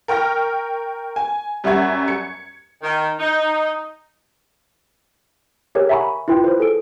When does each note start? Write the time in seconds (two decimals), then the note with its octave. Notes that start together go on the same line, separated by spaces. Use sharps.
0.08 A#4 G5 C#6 F6 A#6
1.16 G#5
1.64 F#2 G3 E5 F#5 C#6 G#6
2.07 G#6 C#7
2.81 D#3
3.19 D#4
5.75 G4 G#4 A#4 C#5
5.89 E5 F#5 G#5 A#5 B5 C#6
6.28 E4 F4 B4 G5
6.44 B4 C5
6.60 G#4 A4 D7